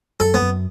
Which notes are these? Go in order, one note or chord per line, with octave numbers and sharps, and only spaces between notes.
F#2 A4
B3
F#2